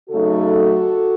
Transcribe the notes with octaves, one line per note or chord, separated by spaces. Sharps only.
C#3 F#3 A3 D#4 F#4 A4